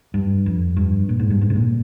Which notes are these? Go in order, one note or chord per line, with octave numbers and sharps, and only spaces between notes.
G2
F2
G2
A#2
G#2
G2
G#2
C3
A#2